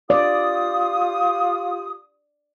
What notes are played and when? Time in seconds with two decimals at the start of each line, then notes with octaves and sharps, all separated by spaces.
0.10 F4 G4 D5 D#6